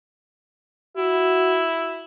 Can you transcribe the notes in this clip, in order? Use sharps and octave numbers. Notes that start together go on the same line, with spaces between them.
E4 F#4